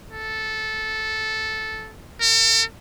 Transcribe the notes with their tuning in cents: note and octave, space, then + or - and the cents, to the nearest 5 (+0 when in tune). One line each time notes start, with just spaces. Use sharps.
A4 -10
A4 +45